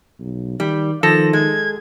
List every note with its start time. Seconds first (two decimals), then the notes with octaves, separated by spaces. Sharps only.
0.20 B1
0.60 D#3 G3
1.03 D#3 F3 A4 A#6
1.33 G#3 G#6